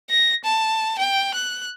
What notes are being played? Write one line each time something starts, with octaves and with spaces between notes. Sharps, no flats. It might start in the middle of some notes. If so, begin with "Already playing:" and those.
A#6
A5
G5
F#6